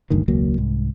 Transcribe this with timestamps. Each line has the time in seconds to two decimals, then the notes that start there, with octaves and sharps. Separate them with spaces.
0.10 F#1 D2 G2 D#3
0.28 E1 C#2 F#3 A#3
0.58 C2 G#2